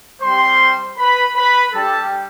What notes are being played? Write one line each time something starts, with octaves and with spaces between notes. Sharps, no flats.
G3 C4 G4 C5 C6
B4 B5
B4 B5
G3 D4 G4 A4 A5